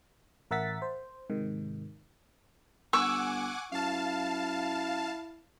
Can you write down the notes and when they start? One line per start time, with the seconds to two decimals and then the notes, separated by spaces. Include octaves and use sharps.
0.51 A1 A#4 E5 F#5 A6 B6
0.82 C5
1.30 G#2 C3 D#3
2.93 G1 F#5 G#5 C#6 D6 E6
3.72 F#2 E4 F5 A5